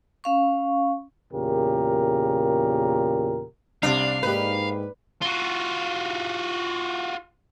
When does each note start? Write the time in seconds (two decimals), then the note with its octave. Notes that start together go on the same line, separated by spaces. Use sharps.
0.24 C#4 F5 C#6
1.33 E2 A#2 C#3 G4 A#4
3.83 C2 C3 D4 F5
4.23 G#2 A#3 D#4 G4 B4
5.22 F4 F#4